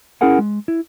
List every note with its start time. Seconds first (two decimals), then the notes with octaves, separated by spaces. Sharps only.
0.21 C#4 E4 G#4 A#4 F#5 G#5
0.39 G#3
0.68 E4